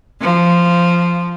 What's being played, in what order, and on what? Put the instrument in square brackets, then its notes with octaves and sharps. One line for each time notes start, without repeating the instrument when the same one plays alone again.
[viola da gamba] F3